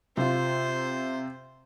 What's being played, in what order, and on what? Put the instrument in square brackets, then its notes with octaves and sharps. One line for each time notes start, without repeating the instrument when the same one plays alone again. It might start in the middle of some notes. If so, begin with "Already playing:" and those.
[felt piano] C3 F4 [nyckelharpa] C5